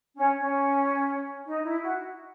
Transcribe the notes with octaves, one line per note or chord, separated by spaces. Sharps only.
C#4
C#4
D#4
E4
F#4